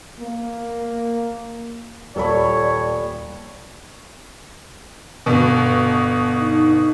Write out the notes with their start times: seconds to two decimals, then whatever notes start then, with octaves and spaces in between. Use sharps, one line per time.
0.20 A#3
2.16 D#1 A4 C#5 D5 B5
5.26 G1 B2
6.40 D#4